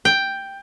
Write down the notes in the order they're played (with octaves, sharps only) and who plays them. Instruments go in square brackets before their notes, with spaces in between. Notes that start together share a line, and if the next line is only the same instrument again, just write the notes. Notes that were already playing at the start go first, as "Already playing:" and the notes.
[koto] G5